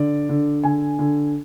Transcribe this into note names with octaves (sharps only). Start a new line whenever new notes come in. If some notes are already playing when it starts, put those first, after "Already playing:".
Already playing: D3 D5
D3
D3 G#5
D3